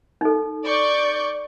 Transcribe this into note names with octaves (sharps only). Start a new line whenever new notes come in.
D#4 A4
D5 C#6 G6